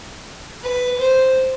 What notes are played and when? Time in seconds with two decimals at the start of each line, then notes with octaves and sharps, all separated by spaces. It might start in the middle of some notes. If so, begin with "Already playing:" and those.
0.64 B4
0.99 C5